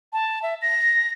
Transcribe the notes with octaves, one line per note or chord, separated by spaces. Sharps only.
A5
E5
A#6